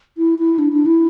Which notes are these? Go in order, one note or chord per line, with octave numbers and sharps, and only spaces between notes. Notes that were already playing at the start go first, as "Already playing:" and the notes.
E4
E4
D4
D4
E4